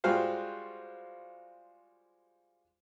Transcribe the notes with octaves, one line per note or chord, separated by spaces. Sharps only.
G3 G#3 F4 F#4 C5 F5